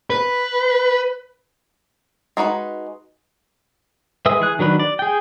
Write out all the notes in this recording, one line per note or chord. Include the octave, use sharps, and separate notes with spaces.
B4
G#3 D#4 F#4 B4
G#3 B4 E5 D#6 E6
E3 G#4 F#6
D#3 F#3 D4 B4
D5
G#4 G5